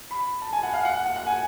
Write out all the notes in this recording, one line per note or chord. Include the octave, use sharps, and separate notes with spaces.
B5
A5
G#5
F#5
F5
F#5
F#5
F#5
G#5